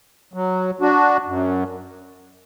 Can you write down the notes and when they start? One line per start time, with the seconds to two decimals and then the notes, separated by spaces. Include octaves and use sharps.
0.34 F#3
0.80 D4 F#4
1.26 F#2